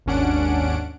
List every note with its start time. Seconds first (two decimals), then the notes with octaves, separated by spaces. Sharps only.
0.06 G#1 D#2 C#4 D4 F#5 D7